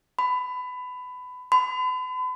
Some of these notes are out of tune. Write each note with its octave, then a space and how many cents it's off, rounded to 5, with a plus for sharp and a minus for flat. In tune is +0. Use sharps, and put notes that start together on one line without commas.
B5 +20
B5 +40